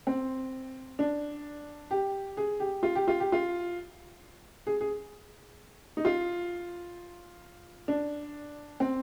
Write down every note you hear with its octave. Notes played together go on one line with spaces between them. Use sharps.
C4
D4
G4
G#4
G4
F4
G4
F4
G4
F4
G#4
G#4
D#4
F4
D4
C4